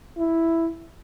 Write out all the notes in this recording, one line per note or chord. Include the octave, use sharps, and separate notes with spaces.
E4